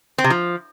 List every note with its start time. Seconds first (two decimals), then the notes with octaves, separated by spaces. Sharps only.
0.18 C4
0.24 C3
0.30 F3